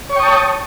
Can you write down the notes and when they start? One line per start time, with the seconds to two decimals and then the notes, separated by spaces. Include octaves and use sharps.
0.10 C#5
0.13 C#6
0.16 G5
0.19 D#6
0.23 A5